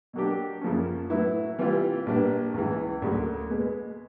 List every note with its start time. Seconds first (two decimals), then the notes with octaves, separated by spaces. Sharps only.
0.13 B2 F#3 A#3 D4 G4
0.62 F#2 C#3 F3 A#3 C#4
1.10 A2 F#3 B3 E4
1.58 C3 E3 G3 C4 F4
2.06 A#1 A#2 G3 B3 D4
2.54 C#2 C#3 E3
3.02 D2 C#3 F#3 A#3
3.50 B2 G#3 B3